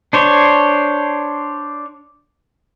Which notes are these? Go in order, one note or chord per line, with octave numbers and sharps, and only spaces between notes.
D4 C5 C#5